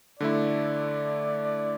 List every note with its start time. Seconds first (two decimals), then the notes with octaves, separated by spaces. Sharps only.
0.20 D3 A3 E4 D5